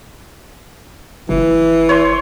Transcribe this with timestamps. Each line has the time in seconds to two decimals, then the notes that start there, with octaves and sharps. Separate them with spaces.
1.29 F#1 E3
1.89 C5 C#5